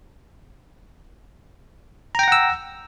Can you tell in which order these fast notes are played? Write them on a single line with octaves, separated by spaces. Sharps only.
A#5 G5 A#6 F#5 E6